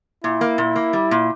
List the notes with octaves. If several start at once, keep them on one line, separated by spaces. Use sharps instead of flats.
A#2 E4
A#3
A#2
A#3
G3
A#2